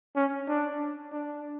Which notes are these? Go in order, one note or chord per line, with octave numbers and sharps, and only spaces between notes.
C#4
D4
D4